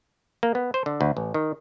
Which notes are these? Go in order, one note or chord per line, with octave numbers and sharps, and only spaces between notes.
A#3
B3
C5
D3
D2
A1
D#3